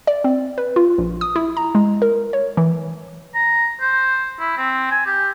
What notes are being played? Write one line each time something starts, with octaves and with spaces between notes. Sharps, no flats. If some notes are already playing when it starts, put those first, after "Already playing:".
D5
C4
B4
F4
A#1
D#6
E4
A#5
G#3
A#4
C#5
E3
A#5
C5
E4
C4
G#5
G4